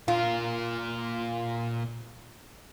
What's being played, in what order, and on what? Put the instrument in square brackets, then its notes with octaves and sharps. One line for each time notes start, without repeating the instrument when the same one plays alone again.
[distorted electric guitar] A#2 A#4 [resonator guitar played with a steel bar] F4